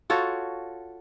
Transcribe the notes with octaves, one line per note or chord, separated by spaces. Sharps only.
F4 F#4 A4 C#5